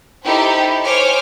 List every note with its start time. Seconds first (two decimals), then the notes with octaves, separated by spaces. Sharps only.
0.23 D#4 E4 G4 A4 C5
0.84 C5 C#5 G#5 D6 F6